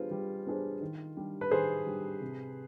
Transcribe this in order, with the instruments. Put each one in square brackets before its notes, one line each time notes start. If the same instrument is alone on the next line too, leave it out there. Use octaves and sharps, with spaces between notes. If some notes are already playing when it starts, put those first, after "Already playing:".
Already playing: [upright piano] G3 B3 D4 G#4 C5 [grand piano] F4
[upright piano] G3
B3 D4 G#4 C5
D#3
G3 D4 G4
[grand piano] B4
[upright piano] D#3 [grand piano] G#4 C5
[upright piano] G3 D4 G4
C3